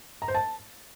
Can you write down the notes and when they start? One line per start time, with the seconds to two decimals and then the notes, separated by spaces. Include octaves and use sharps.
0.22 A#5
0.28 C5
0.35 A5